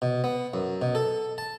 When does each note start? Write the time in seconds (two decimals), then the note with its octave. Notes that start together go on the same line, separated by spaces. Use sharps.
0.02 B2
0.24 B3
0.54 F#2
0.82 B2
0.95 A4
1.38 A5